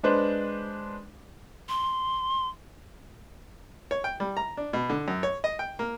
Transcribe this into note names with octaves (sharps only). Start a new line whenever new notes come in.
G#3 D4 B4 C5
C6
C#5
G5
G3
A#5
D4
B2
D3
F#2
C#5
D#5
G5
A#3